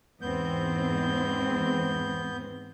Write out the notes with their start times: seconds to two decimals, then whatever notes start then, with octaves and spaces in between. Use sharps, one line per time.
0.22 E2 G#2 B3 C4 G6